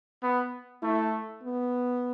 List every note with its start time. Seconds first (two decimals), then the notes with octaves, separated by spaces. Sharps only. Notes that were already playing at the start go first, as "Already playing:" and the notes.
0.22 B3
0.82 A3 E4
1.43 B3